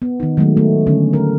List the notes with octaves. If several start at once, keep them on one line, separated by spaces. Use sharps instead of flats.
B3
D#3 D#4
D#3 F#3 G#3 A3
A3
D3 D#3 C#4
A#4